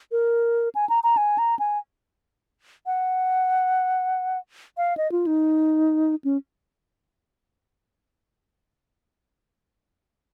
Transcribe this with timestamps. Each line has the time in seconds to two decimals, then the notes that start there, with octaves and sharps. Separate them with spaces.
0.12 A#4
0.75 G#5
0.89 A#5
1.04 A#5
1.17 G#5
1.38 A#5
1.59 G#5
2.86 F#5
4.77 F5
4.97 D#5
5.12 F4
5.27 D#4
6.25 C#4